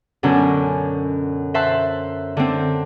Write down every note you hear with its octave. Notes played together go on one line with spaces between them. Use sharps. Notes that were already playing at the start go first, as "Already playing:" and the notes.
F#2 B2 D3 C#4
C5 E5 F#5 A5 C6
D3 C4